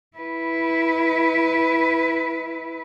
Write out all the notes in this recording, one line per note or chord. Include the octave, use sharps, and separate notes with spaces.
E4 B4